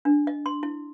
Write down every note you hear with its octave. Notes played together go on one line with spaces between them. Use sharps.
D4
D#5
C6
E4